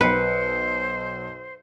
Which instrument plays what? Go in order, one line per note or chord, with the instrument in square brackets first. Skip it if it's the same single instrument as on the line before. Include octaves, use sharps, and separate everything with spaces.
[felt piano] B1 C#7 [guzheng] B4 [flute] C5